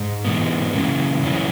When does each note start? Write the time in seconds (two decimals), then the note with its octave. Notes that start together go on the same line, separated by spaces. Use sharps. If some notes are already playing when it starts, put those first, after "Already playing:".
Already playing: G#2
0.25 G#2 E3 G#3 B3
0.73 F#2 C#3 E3
1.22 F#2 C#3 E3